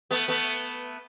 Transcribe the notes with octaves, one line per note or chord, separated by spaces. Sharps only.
A3 B3
A3 B3